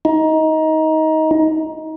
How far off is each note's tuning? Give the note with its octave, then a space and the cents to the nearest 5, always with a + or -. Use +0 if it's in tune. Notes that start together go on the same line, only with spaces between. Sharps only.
D#4 +20